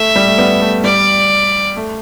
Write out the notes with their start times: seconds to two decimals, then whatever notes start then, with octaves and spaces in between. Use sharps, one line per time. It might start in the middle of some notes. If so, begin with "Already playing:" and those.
Already playing: A3 E5
0.16 G3
0.27 A3
0.38 G3 B3
0.61 A3
0.84 G3 D5
1.76 A3